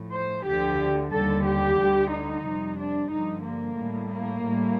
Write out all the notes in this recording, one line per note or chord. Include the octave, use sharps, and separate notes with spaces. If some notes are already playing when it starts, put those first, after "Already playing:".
Already playing: A2 F3
C5
D2 D3 F3 G4
D#2 D3 G3 A4
G4
D2 D3 G3
D#4
F2 C3 G3
D4
G2 D3 F3 D#4
A#3
A2 G3
A#3
A2 G3